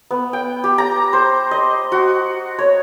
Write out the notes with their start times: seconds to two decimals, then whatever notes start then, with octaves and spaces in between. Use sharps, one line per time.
0.11 B3
0.33 G5
0.64 G4
0.78 A#5
1.13 C5
1.51 D#5
1.92 F#4
2.59 C#5